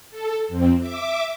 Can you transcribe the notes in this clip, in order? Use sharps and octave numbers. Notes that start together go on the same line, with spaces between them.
A4
F2 C4
E5 D6